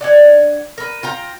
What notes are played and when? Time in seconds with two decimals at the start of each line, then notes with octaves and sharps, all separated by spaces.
0.01 D4 F#5 G#5
0.78 A#4 B4
1.03 F4 G5 A#5